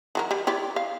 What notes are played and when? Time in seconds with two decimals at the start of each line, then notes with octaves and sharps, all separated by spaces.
0.15 E3 F#3 A#4
0.31 G3
0.47 E4 G4 D5
0.76 F5